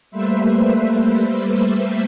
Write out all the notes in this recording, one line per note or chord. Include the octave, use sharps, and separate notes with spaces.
G3 A3 A#3 B4 C5 E5